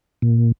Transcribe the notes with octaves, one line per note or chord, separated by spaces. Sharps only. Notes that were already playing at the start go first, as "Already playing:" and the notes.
A#2